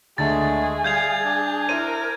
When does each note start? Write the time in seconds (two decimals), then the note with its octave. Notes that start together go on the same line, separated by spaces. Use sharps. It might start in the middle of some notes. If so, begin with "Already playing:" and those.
0.18 D2 D3 G#3 A3 G#4 A5 A6
0.84 G3 F5 G6 G#6 F7
1.24 D4
1.69 E4 A#4 C5 D#7